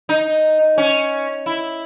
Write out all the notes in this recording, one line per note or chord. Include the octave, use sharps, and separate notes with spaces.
D#4
C#4
E4